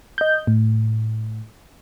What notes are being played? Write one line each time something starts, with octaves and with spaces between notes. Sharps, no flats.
D#5 G6
A2